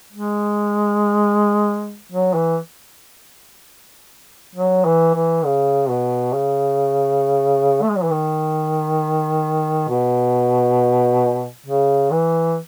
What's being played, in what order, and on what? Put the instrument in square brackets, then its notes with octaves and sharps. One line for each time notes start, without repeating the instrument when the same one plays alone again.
[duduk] G#3
F#3
E3
F#3
E3
E3
C#3
B2
C#3
A3
G#3
F#3
E3
D#3
B2
C#3
E3